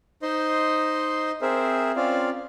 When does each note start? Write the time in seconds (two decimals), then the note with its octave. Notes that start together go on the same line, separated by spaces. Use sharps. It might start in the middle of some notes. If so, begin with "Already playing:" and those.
0.22 D#4 C5 D#5 C6
1.42 C4 G#4 A#4 C5 E5
1.96 C4 C#4 F4 D5 F5